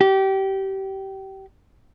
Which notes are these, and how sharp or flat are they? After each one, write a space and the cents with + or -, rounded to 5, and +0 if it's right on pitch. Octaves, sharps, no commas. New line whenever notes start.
G4 -25